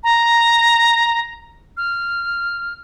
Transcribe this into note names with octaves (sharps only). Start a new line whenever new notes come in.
A#5
F6